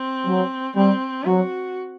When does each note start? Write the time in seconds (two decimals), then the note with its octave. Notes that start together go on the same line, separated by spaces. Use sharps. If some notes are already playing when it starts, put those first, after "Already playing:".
Already playing: C4
0.26 F#3
0.76 G3 C4
1.25 F#3 F#4